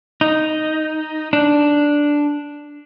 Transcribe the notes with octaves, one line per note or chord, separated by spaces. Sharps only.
D#4
D4